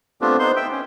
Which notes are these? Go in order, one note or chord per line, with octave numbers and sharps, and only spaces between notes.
A3 B3 C4 D4 F4 G4
B3 D#4 C5 C6
E5 G5
C#4